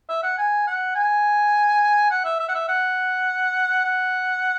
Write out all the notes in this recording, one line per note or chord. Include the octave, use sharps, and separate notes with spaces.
E5
F#5
G#5
F#5
G#5
F#5
E5
E5
F#5
E5
F#5
F#5